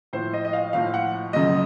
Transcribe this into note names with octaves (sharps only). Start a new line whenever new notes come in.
A2 F3 C5
D#5
D#5
F5
A2 F3 F5
F#5
F#2 C#3 F3 D#5